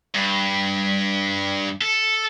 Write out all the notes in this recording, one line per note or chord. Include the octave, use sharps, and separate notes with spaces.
G2
A4